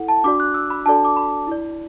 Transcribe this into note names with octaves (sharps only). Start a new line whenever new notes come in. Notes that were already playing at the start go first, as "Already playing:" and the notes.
Already playing: E4 A4 F#5
A5
D4 F#4 D5 D6
F#6
E6
B5
D4 F#4 A4 D5 A5
D6
B5
E4 D5